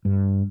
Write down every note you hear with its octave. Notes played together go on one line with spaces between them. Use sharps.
G2